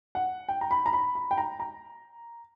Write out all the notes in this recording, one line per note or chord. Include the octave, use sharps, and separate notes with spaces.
F#5
G5
A#5
B5
A#5
B5
B5
G5
A#5
A#5